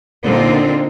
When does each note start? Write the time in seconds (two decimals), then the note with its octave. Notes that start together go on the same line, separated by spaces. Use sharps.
0.23 A#2 D3 A#3 C4 D#4 F4